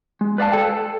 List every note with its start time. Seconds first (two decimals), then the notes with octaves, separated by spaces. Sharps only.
0.21 G#3
0.38 B4 D5 F5 A5
0.52 A4 G5
0.69 A4